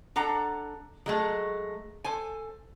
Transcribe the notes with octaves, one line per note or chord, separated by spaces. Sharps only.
D4 A4 F#5 A#5
F#3 G#3 A3
A4 C5 G#5